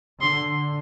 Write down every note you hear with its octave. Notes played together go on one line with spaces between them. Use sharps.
D3 C6